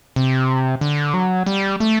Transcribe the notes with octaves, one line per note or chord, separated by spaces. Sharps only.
C3
D3
F#3
G3
A3